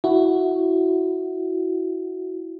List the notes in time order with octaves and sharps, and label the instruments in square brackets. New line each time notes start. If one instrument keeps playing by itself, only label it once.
[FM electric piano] E4 F#4